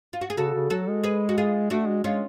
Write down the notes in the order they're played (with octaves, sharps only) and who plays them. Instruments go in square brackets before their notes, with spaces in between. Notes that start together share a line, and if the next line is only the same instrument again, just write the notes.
[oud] F4
F#4
G#4
[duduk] C#3 [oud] F#4 A4
[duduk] C#3
[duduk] F#3 [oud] F#4 A4
[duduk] G#3
[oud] G#4 B4
F#4
F4 G#4
[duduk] A3 [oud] D4 F#4
[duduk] G#3
[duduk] G#3 [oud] C#4 F4